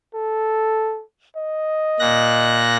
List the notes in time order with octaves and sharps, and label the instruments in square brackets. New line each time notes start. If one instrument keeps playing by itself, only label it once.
[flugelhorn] A4
D#5
[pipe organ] A#2 F#6 A#6